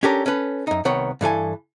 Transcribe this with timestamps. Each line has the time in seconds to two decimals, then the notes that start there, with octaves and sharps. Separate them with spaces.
0.03 C#4 D4 G4 A4 A#4 C#5
0.26 C#4 A4 B4
0.67 F#2 D#4
0.85 C2 D#3 B3 C#5
1.21 G2 E3 A4 G#5